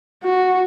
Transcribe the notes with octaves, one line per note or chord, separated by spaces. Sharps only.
F#4